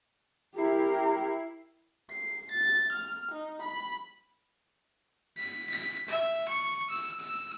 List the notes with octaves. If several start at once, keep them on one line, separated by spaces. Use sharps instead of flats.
E4 G4 A#4 C7
C7
A6
F6
D#4
B5
B6
B6
E5
C#6
E6
E6